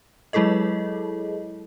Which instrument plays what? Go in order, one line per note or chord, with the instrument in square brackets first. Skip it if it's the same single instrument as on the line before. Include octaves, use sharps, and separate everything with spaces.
[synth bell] F#3 G#3 E4 G#4 A4 D#5